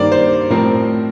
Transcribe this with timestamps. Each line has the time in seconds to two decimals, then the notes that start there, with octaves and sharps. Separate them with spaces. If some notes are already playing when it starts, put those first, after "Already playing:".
Already playing: G2 D#3 A#3 C5 D5
0.12 C5
0.50 A2 F3 C4 A#4